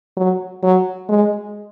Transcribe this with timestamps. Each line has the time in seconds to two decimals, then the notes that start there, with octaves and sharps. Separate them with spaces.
0.17 F#3
0.63 F#3
1.09 G#3